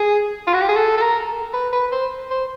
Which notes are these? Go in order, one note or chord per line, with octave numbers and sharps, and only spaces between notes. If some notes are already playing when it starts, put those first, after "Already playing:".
Already playing: G#4
F4
F#4
G4
G#4
A4
A4
A#4
B4
B4
C5
C5